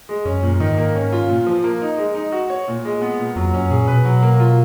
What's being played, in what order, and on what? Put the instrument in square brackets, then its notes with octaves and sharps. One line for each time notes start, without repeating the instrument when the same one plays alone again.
[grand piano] G#3
[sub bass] F#2 [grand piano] C#4
[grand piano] A#2
[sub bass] G#2 [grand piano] D#3
[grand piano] A#3
C#4
F4
A#2
F3
A#3
D#4
G#3
D#4
F#4
C#5
A#2
G#3
B3
A#2
[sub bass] F2 [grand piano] F#3
[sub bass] F#2 [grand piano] C#4
[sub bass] A#2 [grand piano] G#4
[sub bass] B2 [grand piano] B4
[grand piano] F#3
A#3
F4